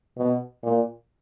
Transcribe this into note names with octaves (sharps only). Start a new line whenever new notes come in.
B2
A#2